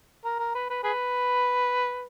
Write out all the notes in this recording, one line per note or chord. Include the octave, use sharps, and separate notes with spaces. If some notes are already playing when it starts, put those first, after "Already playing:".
A#4
A#4
B4
B4
G#4 B4